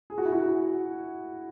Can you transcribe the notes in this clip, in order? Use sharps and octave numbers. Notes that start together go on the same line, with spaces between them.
G#4
F#4
E4
F#4